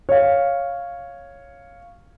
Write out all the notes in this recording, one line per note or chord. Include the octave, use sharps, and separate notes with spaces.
C#5 F5